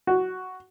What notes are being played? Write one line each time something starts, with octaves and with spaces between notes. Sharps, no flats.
F#4